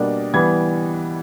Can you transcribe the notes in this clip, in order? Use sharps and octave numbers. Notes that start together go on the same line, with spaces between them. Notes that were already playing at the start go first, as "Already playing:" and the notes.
Already playing: B2 G3 A#3 D4
E3 G3 B3 G#6